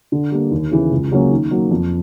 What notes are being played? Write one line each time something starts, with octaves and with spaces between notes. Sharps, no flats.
D3
G3 A#3
D#2
C#3 E3
C#2
C#3 F#3 A#3 C#4
D#3
F#3 A#3
F2